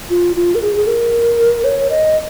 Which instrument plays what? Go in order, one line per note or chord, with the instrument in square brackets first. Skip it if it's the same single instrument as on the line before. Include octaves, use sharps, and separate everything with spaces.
[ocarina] F4
F4
A#4
G#4
G#4
A#4
C#5
D#5